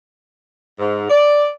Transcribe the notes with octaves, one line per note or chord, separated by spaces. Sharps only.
G#2
D5